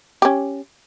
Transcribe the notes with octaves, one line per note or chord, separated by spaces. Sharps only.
C#4 G4